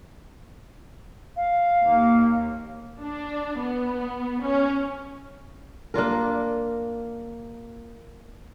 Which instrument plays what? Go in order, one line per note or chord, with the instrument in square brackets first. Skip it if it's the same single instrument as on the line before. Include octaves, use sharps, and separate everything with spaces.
[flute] F5
[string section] D#2 [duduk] A#3
[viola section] D4
B3
C#4
[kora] A#3 D4 F4 A#4